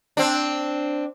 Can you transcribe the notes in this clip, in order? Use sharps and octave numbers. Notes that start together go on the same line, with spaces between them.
C4 D4